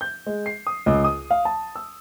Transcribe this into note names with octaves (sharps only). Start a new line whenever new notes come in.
G6
G#3
C7
D#6
C#2
D#6
F5
A5
E6